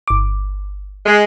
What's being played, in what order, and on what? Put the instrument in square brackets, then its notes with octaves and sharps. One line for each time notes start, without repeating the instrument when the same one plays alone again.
[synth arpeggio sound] G1 D6
[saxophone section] G#3